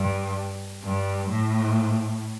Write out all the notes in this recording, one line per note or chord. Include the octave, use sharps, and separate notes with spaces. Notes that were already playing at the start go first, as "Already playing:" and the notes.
Already playing: G2
G2
A2